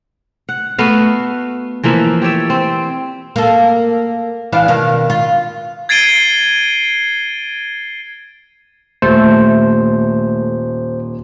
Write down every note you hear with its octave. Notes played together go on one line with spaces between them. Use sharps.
F#5
A3 B3 F#4 F5
E3 F3 A#3 E5
G4 C#5 D5 E5
C4
A#3 A4
E3 D4 F5
B2 D#3 F5
F4
G#6 A6 C7 D7 D#7 G7
D#1 A3 C5